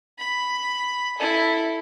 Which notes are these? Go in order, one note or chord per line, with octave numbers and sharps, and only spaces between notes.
B5
E4 A4